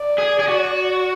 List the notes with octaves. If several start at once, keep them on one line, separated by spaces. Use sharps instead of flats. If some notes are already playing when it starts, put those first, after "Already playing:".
Already playing: D5
G#4
G#4
F#4